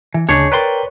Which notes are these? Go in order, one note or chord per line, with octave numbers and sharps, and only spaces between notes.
E3
D2 C#3 D4 D#4 G#4 C#5
A#4 B4 D5 G5 A#5 C6